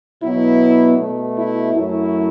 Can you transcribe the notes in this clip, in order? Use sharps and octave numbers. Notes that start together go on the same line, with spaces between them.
B2 F#3 B3 E4
B2 A3
E4
F#2 F#3 A3 E4